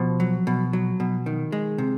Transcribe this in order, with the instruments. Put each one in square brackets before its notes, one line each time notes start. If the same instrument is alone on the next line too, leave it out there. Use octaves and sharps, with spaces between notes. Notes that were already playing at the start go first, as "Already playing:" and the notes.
Already playing: [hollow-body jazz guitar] B2 [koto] F3
[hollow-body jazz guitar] F#3
B2
F#3
B2
D#3
G#3
C3